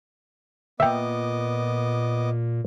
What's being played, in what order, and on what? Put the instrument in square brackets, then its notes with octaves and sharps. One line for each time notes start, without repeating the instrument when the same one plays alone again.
[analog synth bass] A#2 [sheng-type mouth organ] B3 D#5 D6 [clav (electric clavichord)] E5 G5